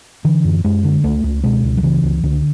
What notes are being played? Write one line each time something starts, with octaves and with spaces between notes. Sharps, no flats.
D3 E3
F#2
F#2 G#3
D3
C#2 A3
C#2
B2 G#3
C#2
F#3
C#3 E3
C#2
C#2 D3